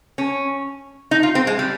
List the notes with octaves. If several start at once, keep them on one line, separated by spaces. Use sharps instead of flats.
C#4
D#4
F4
C4
G#3
G3